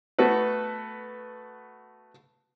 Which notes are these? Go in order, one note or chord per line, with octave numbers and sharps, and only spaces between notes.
A3 B3 F#4 A4 B4